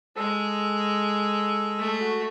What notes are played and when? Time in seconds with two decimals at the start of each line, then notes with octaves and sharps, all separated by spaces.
0.16 G#3 A4
1.79 A3
2.01 F#4